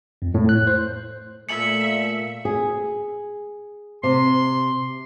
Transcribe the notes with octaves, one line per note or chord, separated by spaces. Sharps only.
F2
A2
F#6
C5
A#2 A3 E5 C#7 F#7
G#4
C3 C6